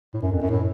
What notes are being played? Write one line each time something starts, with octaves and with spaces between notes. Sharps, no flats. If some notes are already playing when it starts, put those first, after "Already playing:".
A2
F#2
F2
F#2
A2